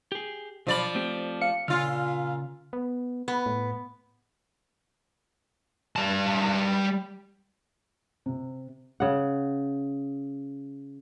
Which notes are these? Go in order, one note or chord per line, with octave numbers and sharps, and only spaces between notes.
G4 G#4
B1 F3 D5 B5
A3 C4 G4
F5 C#7
A#2 C#3 F4 C6 F6
B3
B3
A2
G3 A5
C3
C#3 F#5